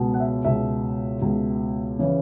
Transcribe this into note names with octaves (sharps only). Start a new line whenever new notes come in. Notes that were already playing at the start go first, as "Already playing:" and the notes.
Already playing: C#2 B2
F#5
E5
C#2 B2 E5
C#2 B2
C#3 E3